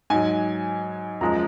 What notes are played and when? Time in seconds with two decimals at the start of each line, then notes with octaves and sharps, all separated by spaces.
0.10 G#2 F#3 G#5
1.21 F#2 F3 G#3 A#5